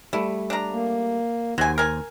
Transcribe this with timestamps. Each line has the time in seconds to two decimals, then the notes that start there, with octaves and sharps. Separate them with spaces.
0.13 G3 A3 E4
0.50 D4 A#5
0.72 A#3
1.58 D#2 F#3 C5 G#5
1.78 A#4 G#5